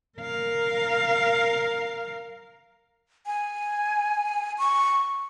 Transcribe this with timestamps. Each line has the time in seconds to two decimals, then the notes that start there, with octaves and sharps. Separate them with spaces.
0.19 A#4 F5
3.26 G#5
4.58 C#6